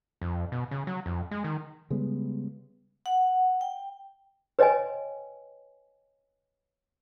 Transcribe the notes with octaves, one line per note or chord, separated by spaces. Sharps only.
F2
B2
C#3
F#3
F2
G#3
D#3
C#3 G3 G#3 B3
F#5
G5
B4 C#5 D#5 G5 G#5